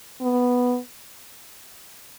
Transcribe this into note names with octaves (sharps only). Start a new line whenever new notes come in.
B3